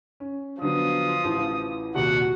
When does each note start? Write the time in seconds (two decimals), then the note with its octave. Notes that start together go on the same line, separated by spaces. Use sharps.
0.20 C#4
0.62 D3 F3 F#3 B3 D#6
1.25 A1 E3
1.95 D#1 C2 A#2 F#4 F#5